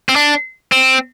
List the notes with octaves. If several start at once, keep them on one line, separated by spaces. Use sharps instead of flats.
C4
D4
C4